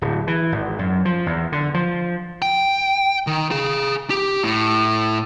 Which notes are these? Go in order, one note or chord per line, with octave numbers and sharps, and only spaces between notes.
D1
E3
G#1
F#2
F3
E2
D3
F3
G5
D#3
G#4 F5
G4
A2